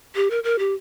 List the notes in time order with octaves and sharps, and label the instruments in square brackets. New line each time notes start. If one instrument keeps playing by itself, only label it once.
[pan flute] G4
A#4
A#4
G4